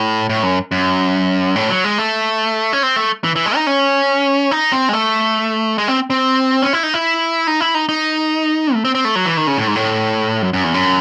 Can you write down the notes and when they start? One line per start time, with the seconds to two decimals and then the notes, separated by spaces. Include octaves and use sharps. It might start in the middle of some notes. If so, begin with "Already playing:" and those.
Already playing: A2
0.30 A2
0.43 F#2
0.71 F#2
1.56 A2
1.70 F#3
1.84 G#3
1.98 A3
2.73 C#4
2.83 C4
2.96 A3
3.24 E3
3.36 E3
3.46 G#3
3.56 D#4
3.67 C#4
4.51 D#4
4.72 C4
4.89 G#3
4.93 A3
5.78 G#3
5.88 C4
6.10 C4
6.62 C#4
6.73 E4
6.83 D#4
6.94 E4
7.47 D#4
7.60 E4
7.75 D#4
7.89 D#4
8.74 A3
8.85 C4
8.95 C4
9.05 A3
9.16 F#3
9.26 E3
9.37 D#3
9.47 C#3
9.58 A2
9.67 G#2
9.75 A2
10.42 F#2
10.53 F#2
10.64 E2
10.74 F#2